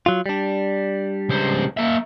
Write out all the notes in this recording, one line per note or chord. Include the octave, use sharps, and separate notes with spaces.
F#3 F4
G3 D4
C#2 C5
A#3 E5